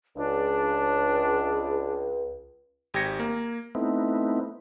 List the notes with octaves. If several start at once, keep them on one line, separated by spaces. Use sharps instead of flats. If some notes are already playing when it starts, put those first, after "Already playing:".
C#2 D4
G#1 G4 G#6 A#6 C#7
A#3
A3 B3 C4 D#4 E4